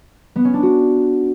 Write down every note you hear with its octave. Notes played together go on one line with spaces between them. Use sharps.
B3
C#4
D4
F#4